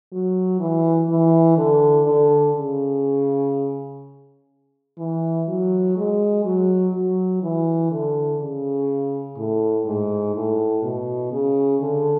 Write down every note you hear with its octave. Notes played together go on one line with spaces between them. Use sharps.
F#3
E3
E3
D3
D3
C#3
E3
F#3
G#3
F#3
F#3
E3
D3
C#3
A2
G#2
A2
B2
C#3
D3